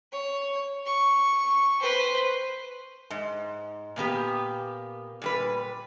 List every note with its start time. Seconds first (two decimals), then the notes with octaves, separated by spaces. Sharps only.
0.12 C#5
0.86 C#6
1.82 B4 C5
3.10 G#2
3.96 A#2 A#3 B3 G4
5.22 A#2 G3 B4